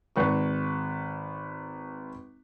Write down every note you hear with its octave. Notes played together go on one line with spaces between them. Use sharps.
G#1 B4 C#6